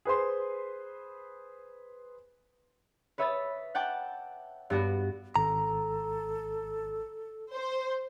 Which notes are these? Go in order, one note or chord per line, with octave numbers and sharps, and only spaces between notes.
G#4 B4 C5 C6
B4 C#5 E5 B5 D#6 A6
F#5 G5 A5 D6
G2 B3 F#4 D5
G#1 A4 A#5
C5